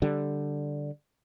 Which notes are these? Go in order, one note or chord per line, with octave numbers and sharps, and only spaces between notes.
D3 G3